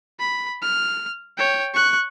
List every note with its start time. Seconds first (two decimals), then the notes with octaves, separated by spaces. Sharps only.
0.19 B5
0.62 F6
1.38 C#5 G5
1.74 C#6 F#6